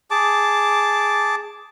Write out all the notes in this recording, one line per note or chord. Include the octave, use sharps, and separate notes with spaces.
G#4 A5 D6